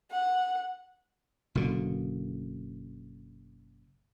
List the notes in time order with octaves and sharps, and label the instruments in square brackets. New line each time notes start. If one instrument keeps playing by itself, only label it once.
[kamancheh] F#5
[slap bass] F#1 B2 D3